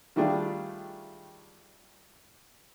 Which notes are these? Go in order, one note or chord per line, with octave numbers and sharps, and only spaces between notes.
D#3 G3 A3 D4 F4 G#4